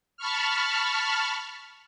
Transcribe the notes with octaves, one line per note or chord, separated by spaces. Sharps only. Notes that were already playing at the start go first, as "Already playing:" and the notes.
A5 B5 C#6 F6